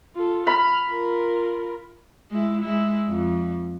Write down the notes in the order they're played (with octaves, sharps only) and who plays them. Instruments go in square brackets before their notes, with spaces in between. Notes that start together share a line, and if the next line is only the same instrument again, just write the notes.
[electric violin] F4 A4
[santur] B5 [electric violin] F6
[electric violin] F4 A#4
[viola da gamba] G#3 E4
G#3 E4
F2